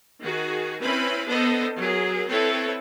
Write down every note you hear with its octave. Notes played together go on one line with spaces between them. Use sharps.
D#3 F#4 G#4
C4 C#4 E4 B4 B5
B3 D4 A4 C5 D#5
F#3 G#4 A#4
C4 E4 A4 B4 C#5